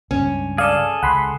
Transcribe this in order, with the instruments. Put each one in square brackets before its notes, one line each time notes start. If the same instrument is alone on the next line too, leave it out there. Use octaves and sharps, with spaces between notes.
[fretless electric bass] C#2 G2 [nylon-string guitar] C#4
[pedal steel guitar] G#4 A4 [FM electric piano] D5 F5
[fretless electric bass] C#2 [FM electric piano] F#5 B5 C6